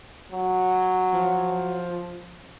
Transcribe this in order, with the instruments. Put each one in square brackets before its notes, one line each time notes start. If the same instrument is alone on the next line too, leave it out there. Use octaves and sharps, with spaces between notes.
[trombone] F#3
[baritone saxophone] F3